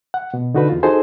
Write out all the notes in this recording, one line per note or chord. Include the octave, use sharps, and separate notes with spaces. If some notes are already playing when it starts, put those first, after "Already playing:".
F#5
B2
D3 D#4 F#4 A4 B4
E2 F4
D#4 F#4 G#4 A4 C5 G#5